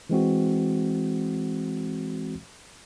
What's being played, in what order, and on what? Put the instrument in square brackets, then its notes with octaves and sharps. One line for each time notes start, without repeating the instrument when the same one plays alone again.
[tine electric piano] E3 G#3 C4 F#4